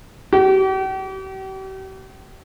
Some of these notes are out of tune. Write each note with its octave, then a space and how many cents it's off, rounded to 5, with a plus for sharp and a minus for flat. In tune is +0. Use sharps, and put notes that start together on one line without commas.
G4 -45